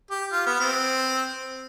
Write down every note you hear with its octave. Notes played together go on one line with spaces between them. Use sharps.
G4
F4
B3
C4